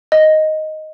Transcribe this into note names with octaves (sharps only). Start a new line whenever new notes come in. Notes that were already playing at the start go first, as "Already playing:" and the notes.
D#5